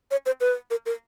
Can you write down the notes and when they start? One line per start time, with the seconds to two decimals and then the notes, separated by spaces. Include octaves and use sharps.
0.11 C#5
0.26 C5
0.41 B4
0.70 A#4
0.86 A#4